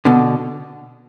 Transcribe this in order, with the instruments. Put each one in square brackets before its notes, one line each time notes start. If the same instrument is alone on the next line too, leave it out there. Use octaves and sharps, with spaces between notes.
[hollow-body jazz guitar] B2 D3